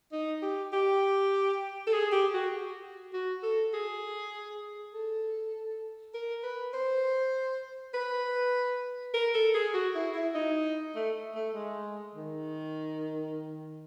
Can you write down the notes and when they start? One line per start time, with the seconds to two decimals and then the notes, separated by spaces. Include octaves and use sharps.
0.12 D#4
0.42 G4
0.73 G4
1.87 A4
1.93 G#4
2.12 G4
2.33 F#4
3.13 F#4
3.43 A4
3.74 G#4
4.94 A4
6.14 A#4
6.43 B4
6.74 C5
7.94 B4
9.14 A#4
9.34 A4
9.55 G#4
9.74 F#4
9.95 E4
10.15 E4
10.34 D#4
10.95 A3
11.35 A3
11.54 G#3
12.14 D#3